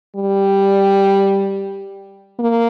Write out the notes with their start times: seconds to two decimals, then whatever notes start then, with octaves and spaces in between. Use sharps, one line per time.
0.16 G3
2.39 A#3